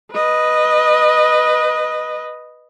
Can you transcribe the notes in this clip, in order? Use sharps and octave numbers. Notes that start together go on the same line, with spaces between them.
B4 D#5